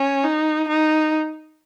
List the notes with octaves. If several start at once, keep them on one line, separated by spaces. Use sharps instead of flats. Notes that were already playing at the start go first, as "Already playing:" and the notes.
Already playing: C#4
D#4
D#4